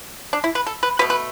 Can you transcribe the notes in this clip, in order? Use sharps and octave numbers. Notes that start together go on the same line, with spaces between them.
D4
E4
B4
A4
B4
B2 A3 B4
B4